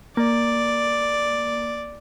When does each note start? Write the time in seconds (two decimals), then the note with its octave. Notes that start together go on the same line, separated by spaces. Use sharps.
0.17 A#3 D5